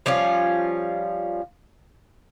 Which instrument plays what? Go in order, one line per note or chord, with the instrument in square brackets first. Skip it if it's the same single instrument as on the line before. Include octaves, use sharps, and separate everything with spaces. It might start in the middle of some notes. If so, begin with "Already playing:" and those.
[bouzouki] F3 G3 C#4 F4